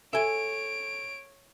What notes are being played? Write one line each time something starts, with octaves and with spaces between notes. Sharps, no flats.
A4 C#5 E5 G#5 D7